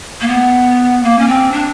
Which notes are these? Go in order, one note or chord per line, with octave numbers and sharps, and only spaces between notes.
A#3
B3
A#3
C#4
C4
D4